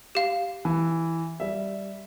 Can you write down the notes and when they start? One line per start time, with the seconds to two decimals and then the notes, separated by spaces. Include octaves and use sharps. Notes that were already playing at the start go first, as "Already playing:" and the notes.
0.15 G4 F5
0.65 E3
1.40 G3 E5